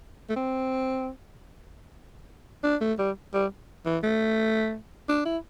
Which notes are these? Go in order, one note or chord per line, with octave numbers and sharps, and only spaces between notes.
A3
C4
D4
A3
G3
G3
E3
A3
D4
E4